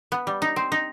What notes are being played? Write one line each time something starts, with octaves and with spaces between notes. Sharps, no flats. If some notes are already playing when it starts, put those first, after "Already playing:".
B3
G3
D#4
C4
D#4